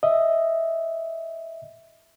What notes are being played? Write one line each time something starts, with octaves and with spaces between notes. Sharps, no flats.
D#5 E5